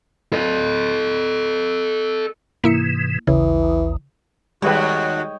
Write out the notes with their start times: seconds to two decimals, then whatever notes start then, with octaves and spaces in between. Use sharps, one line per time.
0.33 A4 D#5
2.64 G#2 C3 E3 A#3 E4 C#7
3.27 A1 D#2 C#3 E3
4.62 D#2 G3 G#3 F#4 B4 C#5 D#5 G5